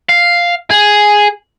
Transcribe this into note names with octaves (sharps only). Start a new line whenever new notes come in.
F5
G#4